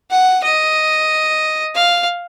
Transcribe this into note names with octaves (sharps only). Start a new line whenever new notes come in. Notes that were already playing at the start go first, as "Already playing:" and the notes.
F#5
D#5
F5